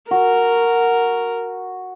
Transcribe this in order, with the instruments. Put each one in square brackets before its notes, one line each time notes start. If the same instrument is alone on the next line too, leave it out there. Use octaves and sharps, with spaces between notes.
[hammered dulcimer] F#4 [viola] A#4